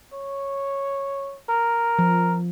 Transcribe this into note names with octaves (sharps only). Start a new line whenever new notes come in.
C#5
A#4
F3